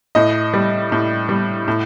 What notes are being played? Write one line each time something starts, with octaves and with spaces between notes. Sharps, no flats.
A2 D#5
G3
A2
G3
A2